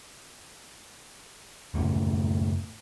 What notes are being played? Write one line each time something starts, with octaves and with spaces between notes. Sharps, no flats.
F#2 A2 C#3 A3